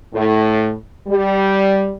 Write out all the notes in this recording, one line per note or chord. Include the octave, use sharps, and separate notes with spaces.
A2
G3